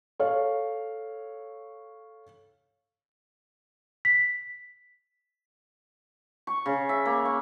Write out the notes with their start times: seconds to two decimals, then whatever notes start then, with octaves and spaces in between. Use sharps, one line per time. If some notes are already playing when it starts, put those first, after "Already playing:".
0.19 A4 C#5 F5
4.05 B6
6.47 C#6
6.66 C#3
6.89 E5
7.05 A#3
7.25 C#6